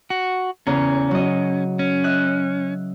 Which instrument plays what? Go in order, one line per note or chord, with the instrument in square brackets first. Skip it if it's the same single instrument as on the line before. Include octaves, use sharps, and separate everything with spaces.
[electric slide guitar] F#4
[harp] E2 C#3 A#5 [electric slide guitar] C#4
[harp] F#3 D#5
[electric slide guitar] C#4
[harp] D#5 E5 F#6